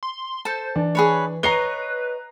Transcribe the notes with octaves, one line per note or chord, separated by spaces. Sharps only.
C6
A4 C5 A5
E3 D4
G#4 B4 C#5
B4 C#5 D#5 A#5 C7 G7